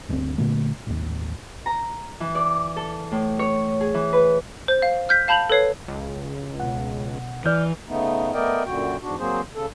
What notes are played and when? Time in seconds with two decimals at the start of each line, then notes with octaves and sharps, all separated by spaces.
0.09 G1 D2 C#3 C4
0.38 A#2 D3 A3
0.87 A1 D#2
1.66 A#5
2.20 E3
2.35 D5
2.77 A4
3.12 A2
3.39 C#5
3.81 G#4
3.94 E3
4.13 B4
4.68 C5 G6
4.82 F5
5.09 F6 G6 B6
5.28 F5 A5 B5 G6 F7 F#7
5.50 A4 B4 C#5 C7
5.88 C#2
6.60 B2 F#5
7.46 E3 D5 F6 G6
7.88 C#3 A3 B3 D#4
8.34 A3 B3 A#4 D5 D#5 G5
8.66 F#2 A#2 D3 F#4 G5
9.02 E2 G#2 D4 F#4
9.19 F#3 A#3 C4 G#4 C5
9.55 C#3 A4